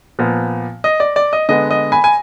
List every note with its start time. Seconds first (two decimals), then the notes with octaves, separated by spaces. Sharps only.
0.19 A#2 F3 B3
0.84 D#5
1.00 D5
1.16 D5
1.33 D#5
1.49 D3 G#3 B3 D#5
1.71 D#5
1.92 G#5 B5
2.04 G#5